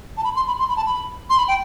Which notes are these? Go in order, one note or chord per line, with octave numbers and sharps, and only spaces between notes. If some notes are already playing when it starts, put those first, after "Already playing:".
A5
B5
C6
B5
C6
B5
A5
B5
C6
B5
G5